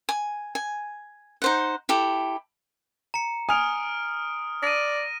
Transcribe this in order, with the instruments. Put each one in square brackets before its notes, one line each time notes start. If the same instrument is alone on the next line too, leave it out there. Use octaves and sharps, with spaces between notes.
[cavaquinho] G#5
G#5
D#4 C5 F#5
E4 G4 A4
[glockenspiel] A#5 C#7
[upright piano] G#5 F7 [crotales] D#6 F6 D7
[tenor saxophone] D5 [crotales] A#6 D#7